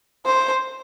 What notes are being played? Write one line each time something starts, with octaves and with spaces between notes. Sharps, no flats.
C5